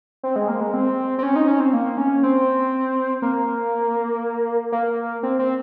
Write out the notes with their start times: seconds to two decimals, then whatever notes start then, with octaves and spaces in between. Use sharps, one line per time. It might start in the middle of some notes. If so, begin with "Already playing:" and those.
0.23 C4
0.36 G#3
0.48 A#3
0.61 G#3
0.74 C4
1.18 C4
1.23 C#4
1.36 D#4
1.47 C#4
1.60 C4
1.73 A#3
1.97 C#4
2.23 C4
3.22 A#3
4.72 A#3
5.23 C4
5.39 C4